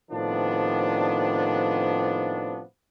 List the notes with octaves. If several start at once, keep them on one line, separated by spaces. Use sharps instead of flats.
A2 C3 D#3 F3 B3 D4